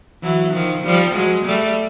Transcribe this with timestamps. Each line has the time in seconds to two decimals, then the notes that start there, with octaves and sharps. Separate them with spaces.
0.23 E3 F#3
0.53 D#3 F3
0.85 F3 G3
1.15 F#3 G#3
1.46 G3 A3